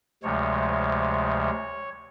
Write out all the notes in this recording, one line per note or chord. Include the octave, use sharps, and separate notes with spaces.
D2 C3 F3 G#3 C#5